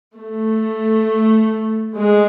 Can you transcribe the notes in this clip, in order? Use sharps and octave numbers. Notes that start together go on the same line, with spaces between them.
A3
G#3